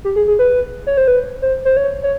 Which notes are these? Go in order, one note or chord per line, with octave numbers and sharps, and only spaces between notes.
G4
G#4
G#4
B4
C#5
C5
B4
C5
C5
C#5
C#5